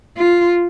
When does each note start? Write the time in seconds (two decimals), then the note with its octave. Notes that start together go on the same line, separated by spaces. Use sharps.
0.17 F4